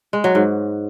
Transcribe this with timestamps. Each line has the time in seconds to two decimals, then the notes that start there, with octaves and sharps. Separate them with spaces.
0.13 G#3
0.24 F#3
0.35 G#2